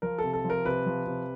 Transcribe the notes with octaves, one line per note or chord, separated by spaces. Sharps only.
F3 A#4
A4
C3
A4
F3
A#4
C3 B4
F3
C3